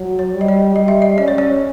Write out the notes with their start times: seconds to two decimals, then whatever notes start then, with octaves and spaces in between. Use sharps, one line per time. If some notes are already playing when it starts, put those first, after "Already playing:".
Already playing: F#3
0.19 C#5
0.34 G3
0.41 D#5
0.48 D5
0.76 G3 D#5
0.88 E5
1.02 D#5
1.18 C#4 D5
1.28 C#5
1.38 D5